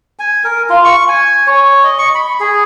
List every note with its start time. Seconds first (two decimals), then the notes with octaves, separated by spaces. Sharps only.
0.19 G#5
0.44 A#4
0.70 F4
0.85 C#6
1.08 G#5
1.47 C#5
1.84 D#5
1.99 C#6
2.15 B5
2.40 G#4